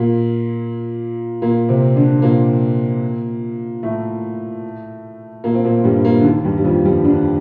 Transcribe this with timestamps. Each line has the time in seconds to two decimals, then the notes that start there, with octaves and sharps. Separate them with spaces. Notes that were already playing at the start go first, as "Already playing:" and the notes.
Already playing: A#2 A#3
1.42 A#2 A#3
1.69 C3 C4
1.96 D3 D4
2.19 C4
2.22 A#2 A#3
3.83 A2 A3
5.44 A#2 A#3
5.55 C4
5.64 A#2 A#3
5.84 G2 G3
6.05 A#2 A#3
6.20 D3
6.25 D#2 D#3
6.44 G2 G3
6.58 G3
6.64 F2 F3
6.85 G2 G3
7.04 D3 D4